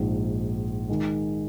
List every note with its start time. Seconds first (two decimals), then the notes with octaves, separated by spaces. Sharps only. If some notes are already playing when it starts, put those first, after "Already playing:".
Already playing: A#1 G#2 G#3 D#4
0.89 D#3 G#3